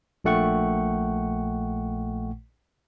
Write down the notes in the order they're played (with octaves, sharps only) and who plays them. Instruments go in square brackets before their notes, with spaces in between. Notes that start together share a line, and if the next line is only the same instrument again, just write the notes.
[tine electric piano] A#1 A#2 A3 F#5 G5 C#6